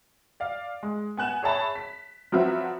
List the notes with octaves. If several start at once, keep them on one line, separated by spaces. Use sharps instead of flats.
D5 F5
G#3
B3 G#5 F#6 E7
G#4 C#5 E5 A5 B5 E7
B6
F3 F#3 C4 F#4 B4 E5